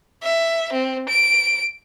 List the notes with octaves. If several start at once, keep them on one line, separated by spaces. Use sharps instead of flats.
E5
C4
D7